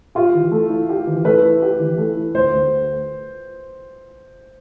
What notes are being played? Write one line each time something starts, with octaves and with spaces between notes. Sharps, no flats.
F4 G4
E3
A3
E4
G4
E3
A3 B4
E4
G4
E3
A3
E4
D2 C5
D2